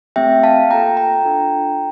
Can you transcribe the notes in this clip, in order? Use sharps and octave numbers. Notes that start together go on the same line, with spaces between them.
A3 C4 G4 E5 G5
F5 A5
A#3 F4 A4 G5 A#5
G5 A#5
D4 F4 A4